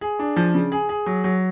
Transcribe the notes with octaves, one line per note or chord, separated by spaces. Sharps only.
G#4
D4
F3
C#3
G#4
G#4
F#3
F#3